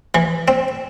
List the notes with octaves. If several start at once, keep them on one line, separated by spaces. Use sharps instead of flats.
E3
C4